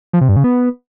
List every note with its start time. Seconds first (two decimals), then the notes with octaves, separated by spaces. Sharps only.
0.13 F3
0.21 C3
0.29 G2
0.36 C#3
0.44 B3